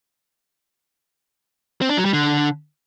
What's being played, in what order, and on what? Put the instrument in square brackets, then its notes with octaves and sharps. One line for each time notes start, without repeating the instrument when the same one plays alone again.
[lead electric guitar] C4
D4
F#3
G3
D3